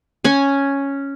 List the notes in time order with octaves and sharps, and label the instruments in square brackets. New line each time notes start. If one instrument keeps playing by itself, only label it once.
[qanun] C#4 G#5